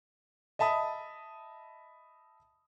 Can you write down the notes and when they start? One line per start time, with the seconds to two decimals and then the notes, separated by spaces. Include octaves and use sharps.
0.59 D#5 E5 A5 B5 D#6